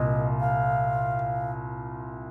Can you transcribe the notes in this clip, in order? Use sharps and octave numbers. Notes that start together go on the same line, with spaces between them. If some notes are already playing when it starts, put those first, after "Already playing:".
Already playing: C2 A#2 D#5
F5